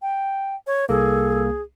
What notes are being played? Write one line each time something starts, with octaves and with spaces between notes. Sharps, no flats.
G5
C#5
C2 A#3 G#4 A4